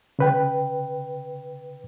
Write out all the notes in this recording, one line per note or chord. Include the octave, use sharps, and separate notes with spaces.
C#3 B4 G5